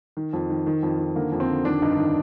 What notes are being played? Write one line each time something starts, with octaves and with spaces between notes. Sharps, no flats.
D#3
F2
D#3
D#3
F2
D#3
D3 A#3
F2
C4
D3
D#3 D4
G2 D#4
D#3